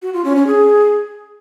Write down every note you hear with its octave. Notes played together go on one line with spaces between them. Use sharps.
F#4
F4
C#4
C#4
G#4